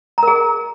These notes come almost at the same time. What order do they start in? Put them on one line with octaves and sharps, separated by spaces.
A#5 A#4 G#4